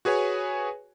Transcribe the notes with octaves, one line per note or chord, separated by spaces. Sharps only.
F#4 G#4 B4 C#5 G#5